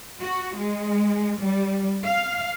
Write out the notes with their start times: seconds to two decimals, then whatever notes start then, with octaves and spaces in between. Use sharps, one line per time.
0.21 F#4
0.57 G#3
1.41 G3
2.04 F5